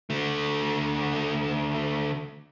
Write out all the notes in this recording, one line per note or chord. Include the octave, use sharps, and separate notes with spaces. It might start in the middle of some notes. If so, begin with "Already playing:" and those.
D3 A3